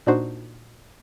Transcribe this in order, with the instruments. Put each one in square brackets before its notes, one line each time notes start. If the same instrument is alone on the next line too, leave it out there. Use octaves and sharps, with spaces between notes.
[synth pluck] A#2 D4 D#4 F#4 C5